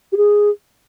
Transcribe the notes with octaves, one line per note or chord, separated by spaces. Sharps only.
G4
G#4